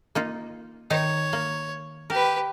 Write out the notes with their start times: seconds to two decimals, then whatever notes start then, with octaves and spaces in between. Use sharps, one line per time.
0.15 A#3 D#4 F4
0.90 D#3 D#4 C#5
1.33 A#3
2.10 G4 A#4 B4